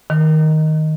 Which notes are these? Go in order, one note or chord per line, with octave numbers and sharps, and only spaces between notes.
D#3